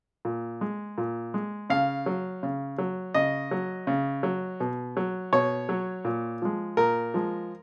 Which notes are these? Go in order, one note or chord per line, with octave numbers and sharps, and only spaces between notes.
A#2
G#3
A#2
G#3
C#3 F5
F#3
C#3
F#3
C#3 D#5
F#3
C#3
F#3
B2
F#3
B2 C#5
F#3
A#2
F3 G#3
A#2 A#4
F3 G#3